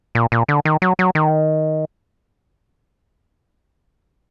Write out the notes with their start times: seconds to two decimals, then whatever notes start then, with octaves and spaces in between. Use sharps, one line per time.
0.15 A#2
0.32 A#2
0.48 D3
0.65 D#3
0.82 F#3
0.99 F#3
1.15 D#3